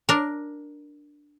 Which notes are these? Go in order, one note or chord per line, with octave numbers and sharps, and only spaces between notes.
D4 A#4